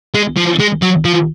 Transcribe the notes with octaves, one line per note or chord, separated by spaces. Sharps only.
G#3
F3
G#3
F#3
F3